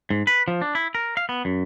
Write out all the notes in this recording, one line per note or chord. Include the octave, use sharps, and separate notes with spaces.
G#2
B4
F3
D4
E4
A#4
F5
B3
F#2